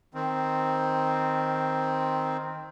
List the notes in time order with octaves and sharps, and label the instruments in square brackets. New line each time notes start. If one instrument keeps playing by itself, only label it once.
[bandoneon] D#3 C4